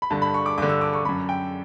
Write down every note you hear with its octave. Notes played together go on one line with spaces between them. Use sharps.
B5
G2 D3 A5
B5
C#6
D6
G2 D3 D6
E6
D6
C#6
F#2 D3 B5
G5